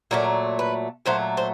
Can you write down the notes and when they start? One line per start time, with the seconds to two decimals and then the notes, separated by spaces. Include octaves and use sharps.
0.11 A#2 F#3 A3 A#4
0.59 B4
1.06 A#2 F#3 A3 C5
1.37 C5